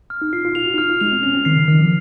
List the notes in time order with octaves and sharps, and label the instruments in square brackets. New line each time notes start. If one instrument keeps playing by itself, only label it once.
[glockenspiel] F6
[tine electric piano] D#4
[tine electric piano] F4 [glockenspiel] C7
[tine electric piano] F4
[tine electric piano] F4 [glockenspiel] F7
[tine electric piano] F#4
D#4
[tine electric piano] F4 [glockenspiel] F6
[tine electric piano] F4
[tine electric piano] G#3 [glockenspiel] F7
[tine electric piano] C4
[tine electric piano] C#4 [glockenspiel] F7
[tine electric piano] C4
[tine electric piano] D#3 [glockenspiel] C7
[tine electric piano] C#3
[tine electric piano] D#3 [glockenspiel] F6
[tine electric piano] F3